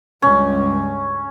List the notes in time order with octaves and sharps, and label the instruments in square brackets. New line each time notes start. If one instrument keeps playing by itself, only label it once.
[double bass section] C#2 G2 [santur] C#4